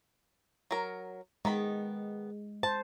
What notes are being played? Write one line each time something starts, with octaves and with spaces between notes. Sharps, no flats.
F#3 A#4
D#3 G#3 B3 B5
C5 A5